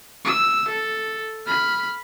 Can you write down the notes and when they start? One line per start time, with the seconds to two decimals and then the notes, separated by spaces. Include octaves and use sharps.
0.25 E6
0.68 A4
1.47 B5 F6